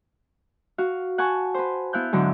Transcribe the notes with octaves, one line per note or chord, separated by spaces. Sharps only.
F#4 F5
F#5 G#5 A5 C#6
B4 C5
B3 E4 F5 F#6 G6
G#2 D3 F#3 G#3